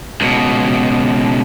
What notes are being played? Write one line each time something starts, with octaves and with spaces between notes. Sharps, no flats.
C#2 B2